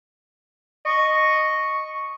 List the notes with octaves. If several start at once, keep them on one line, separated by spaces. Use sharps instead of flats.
D#5 C#6